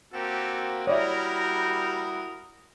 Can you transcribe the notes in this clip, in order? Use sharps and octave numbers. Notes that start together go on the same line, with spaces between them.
A#3 C4 F#4 G4 A4
G3 E4 F#4 A#4 C#5 D5 E5 D#6